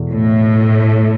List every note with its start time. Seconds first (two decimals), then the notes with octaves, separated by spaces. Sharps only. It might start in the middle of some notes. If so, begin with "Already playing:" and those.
Already playing: E2 B2 A3
0.10 A2